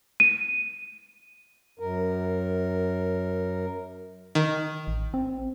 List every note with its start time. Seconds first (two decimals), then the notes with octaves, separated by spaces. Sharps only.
0.20 D#7
1.79 F#2 A#4
4.35 D#3
4.87 A1
5.14 C4